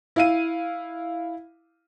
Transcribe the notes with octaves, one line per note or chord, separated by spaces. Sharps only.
E4 F5 D#7